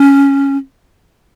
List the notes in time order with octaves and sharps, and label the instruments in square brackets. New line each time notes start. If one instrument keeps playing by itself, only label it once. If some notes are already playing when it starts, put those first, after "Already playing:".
Already playing: [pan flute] C#4